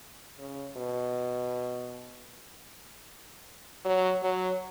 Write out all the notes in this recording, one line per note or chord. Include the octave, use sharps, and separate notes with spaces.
C#3
B2
F#3
F#3